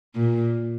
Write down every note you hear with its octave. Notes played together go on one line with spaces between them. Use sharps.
A#2